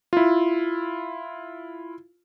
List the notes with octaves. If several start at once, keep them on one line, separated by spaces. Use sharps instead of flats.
E4 F4